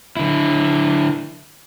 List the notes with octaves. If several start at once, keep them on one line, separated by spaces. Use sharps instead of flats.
D3 E4